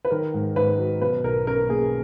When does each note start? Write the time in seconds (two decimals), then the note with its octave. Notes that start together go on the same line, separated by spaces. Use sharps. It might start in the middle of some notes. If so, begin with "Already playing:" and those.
0.05 B4
0.10 D#3 A#4
0.34 G#2
0.56 G#2 B4
0.78 F#3
1.02 B2 B4
1.24 B1 A#4
1.47 C#4 A#4
1.69 A#3 G#4